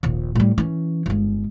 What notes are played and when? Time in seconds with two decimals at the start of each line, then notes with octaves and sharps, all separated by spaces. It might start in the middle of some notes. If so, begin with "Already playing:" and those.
0.03 D#1 A#1
0.35 A2 G3
0.58 E3 C#4
1.06 G1 G#3